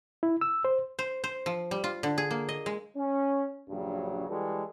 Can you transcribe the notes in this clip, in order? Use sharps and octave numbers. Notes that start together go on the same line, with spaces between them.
E4
E6
C5
C5
C5
F3
G3
F4
D3
G#4
A#3
D#5
G#3
C#4
A#1 G2 C#3 F#3
E3 G3 G#3 F#4 A4